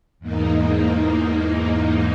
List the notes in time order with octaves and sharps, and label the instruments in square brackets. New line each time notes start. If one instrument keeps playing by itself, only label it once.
[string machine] E2 G#2 A#3 D#4